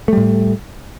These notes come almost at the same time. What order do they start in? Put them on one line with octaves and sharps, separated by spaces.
A3 G3 A2